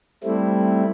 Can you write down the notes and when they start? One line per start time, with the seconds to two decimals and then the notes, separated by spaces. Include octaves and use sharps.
0.24 G3 A3 C4 E4